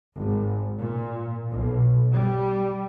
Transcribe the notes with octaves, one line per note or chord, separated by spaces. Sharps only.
G#1
A#2
B1
G3